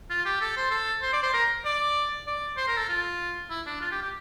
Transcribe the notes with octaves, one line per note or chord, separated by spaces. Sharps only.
F4
G4
A4
C5
A4
C5
D5
C5
A#4
D5
D5
C5
A#4
A4
F4
E4
D4
F4
G4
G4